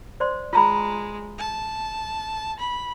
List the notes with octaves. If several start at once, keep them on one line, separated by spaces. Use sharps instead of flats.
C5 D5 C6
G#3 F4 A#5 B5
A5
B5